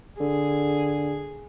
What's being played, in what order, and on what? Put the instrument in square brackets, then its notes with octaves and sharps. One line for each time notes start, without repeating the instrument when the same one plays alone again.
[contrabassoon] D3 [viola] G#4